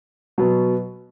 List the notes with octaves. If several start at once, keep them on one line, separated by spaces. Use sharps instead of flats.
B2 F#3 B3